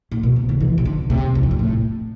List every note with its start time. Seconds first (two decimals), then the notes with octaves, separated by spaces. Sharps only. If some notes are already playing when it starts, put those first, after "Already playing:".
0.12 A2
0.23 B2
0.36 C3
0.49 D3
0.61 E3
0.78 C3
0.86 D3
1.10 C3
1.35 E2
1.43 F2
1.51 G2
1.59 A2